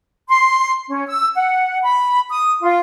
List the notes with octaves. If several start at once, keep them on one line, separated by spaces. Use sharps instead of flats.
C6
C#4
E6
F#5
B5
D#6
F4